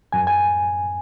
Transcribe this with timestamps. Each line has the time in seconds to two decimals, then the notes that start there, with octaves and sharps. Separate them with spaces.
0.12 F#2 G#5
0.27 G#5